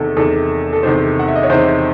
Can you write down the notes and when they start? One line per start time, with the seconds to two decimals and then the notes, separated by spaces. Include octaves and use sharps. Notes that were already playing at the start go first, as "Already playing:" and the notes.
Already playing: E2 C3 D#3 A4
0.17 E2 C3 D#3 A4
0.73 A4
0.83 E2 C3 D#3 C5
1.19 F#5
1.28 E5
1.36 D#5
1.43 C#5
1.50 E2 C3 D#3 C5